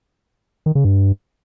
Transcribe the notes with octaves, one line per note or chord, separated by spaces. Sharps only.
D#3
C#3
G2